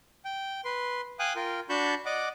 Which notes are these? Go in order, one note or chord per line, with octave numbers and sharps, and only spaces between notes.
G5
B4 C6
F5 G5 G#5 D#6 F#6
F4 A#4 G5
D4 F#4 A5 B5 C#6 G6
D5 D#5 F#5 D6